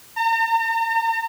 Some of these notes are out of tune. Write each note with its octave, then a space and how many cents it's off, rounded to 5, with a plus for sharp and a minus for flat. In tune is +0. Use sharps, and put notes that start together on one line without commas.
A#5 -45